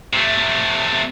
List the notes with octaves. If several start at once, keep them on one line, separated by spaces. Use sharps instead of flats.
C3 A3